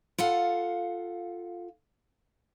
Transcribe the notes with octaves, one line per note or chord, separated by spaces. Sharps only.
F4 A4 F5 F#5